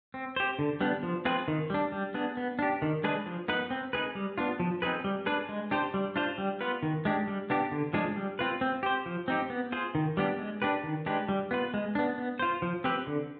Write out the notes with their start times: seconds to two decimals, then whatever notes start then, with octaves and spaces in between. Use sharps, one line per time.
0.14 C4
0.36 G4 C5
0.59 D3
0.81 G3 B3 D4
1.03 F3
1.25 C4 F4 G#4 B4
1.48 D#3
1.70 G3 D4
1.92 G3
2.14 B3 D4 G#4
2.37 B3
2.59 D4 G4
2.82 D#3
3.04 G#3 D4 G#4 B4
3.26 F3
3.48 B3 D#4 B4
3.71 C4
3.93 D#4 G#4 B4
4.15 G3
4.38 B3 D4 F4
4.60 F3
4.82 C4 D#4 G#4 B4
5.04 G3
5.26 D4 G#4 B4
5.49 G#3
5.71 D4 G4 C5
5.94 G3
6.16 D4 F4 C5
6.38 G3
6.61 B3 F4 B4
6.83 D#3
7.05 G#3 D4 G4
7.27 G3
7.50 B3 D4 G4
7.72 D3
7.93 F3 G#3 D4 G#4
8.16 G3
8.39 C4 F4 B4
8.61 C4
8.83 G4 C5
9.06 F3
9.28 C4 D#4 G4
9.50 B3
9.72 F4 G#4 C5
9.95 D#3
10.17 G3 B3 D4 G4
10.39 G#3
10.62 D4 G4 B4
10.84 D#3
11.06 G#3 D4 G4 B4
11.29 G3
11.51 B3 F4 B4
11.74 G#3
11.95 B3 D4
12.18 B3
12.39 F4 C5
12.62 F3
12.84 C4 G4 B4
13.07 D3